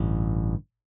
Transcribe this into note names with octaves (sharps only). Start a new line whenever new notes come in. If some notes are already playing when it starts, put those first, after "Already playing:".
Already playing: A1 G2 D3